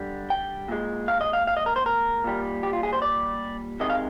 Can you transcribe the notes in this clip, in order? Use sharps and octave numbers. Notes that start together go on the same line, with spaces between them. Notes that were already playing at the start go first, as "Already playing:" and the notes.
Already playing: D3 G3
G5
A#2 G#3
F5
D#5
F5
F5
D#5
A#4
C5
A#4
A#2 G3
G4
F4
G#4
C5
D5
C3 D#3 G#3 D#5
F5